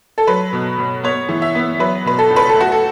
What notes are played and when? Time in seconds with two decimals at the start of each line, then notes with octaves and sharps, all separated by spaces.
0.18 A4
0.27 F#3 B4
0.53 B2
0.78 B2
1.03 B3 C#5
1.29 E3
1.42 E5
1.55 B3
1.79 F#3 B4
2.05 B2 B4
2.18 A4
2.30 C#2
2.36 B4
2.49 A4
2.55 A3
2.60 F#4
2.72 A4